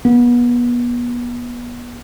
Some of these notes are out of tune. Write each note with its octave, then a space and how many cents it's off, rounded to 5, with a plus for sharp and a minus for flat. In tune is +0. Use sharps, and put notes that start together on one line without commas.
B3 -30